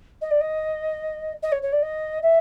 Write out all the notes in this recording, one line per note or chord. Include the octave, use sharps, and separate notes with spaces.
D#5
D5
D#5
D#5
C#5
C#5
D5
D#5
E5